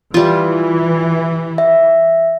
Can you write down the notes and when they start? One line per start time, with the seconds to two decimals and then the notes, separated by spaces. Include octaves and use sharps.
0.14 E3 G3 F4
1.58 E5